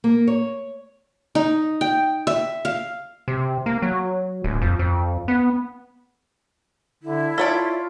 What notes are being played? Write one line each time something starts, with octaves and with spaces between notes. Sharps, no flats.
A#3
C#5
D#4
G5
E5
F5
C3
A#3
F#3
D1
F2
F2
B3
D3 E4
F4 A4 C#5 D5